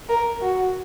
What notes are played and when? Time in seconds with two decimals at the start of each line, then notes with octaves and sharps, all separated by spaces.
0.09 A#4
0.42 F#4